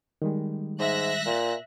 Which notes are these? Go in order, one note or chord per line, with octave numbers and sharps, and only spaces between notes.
D#3 G3 G#3
G#2 E5 F#6 A#6
A#2